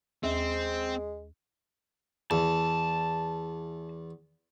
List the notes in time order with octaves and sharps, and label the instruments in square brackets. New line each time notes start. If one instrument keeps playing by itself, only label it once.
[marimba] D#2 [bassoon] G#3 [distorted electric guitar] C4
[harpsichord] E2 [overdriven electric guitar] A5